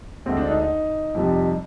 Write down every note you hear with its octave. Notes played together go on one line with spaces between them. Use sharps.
D2 D3 G#3 C4
D4
D#4
D#4
F2 C3 G3